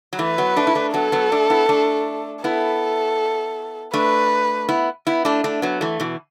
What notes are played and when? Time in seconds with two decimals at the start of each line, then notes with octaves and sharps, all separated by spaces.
0.13 F#3
0.19 E3 A3 B4
0.38 F#3 B3
0.57 A3 D4
0.67 E4
0.75 A3 D4
0.94 F#3 B3 A4
1.12 F#3 B3
1.32 A3 D4
1.50 B3 E4
1.69 A3 D4
2.44 B3 E4 A4
3.94 A3 D4 B4
4.69 B3 E4
5.07 B3 E4
5.25 A3 D4
5.44 A3 D4
5.62 F#3 B3
5.81 E3 A3
6.00 B2 E3